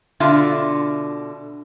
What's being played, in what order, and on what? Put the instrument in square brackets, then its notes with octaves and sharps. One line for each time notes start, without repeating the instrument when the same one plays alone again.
[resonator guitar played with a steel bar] B2 D3 F4 E5